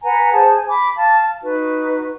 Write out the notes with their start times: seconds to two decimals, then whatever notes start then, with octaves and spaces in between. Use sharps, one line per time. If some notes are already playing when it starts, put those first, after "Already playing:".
0.03 B4 F#5 G#5 A#5
0.33 G#4 C5 A5
0.56 G#5
0.68 B5 D6
0.96 F5 A5
1.42 D#4 F#4 B4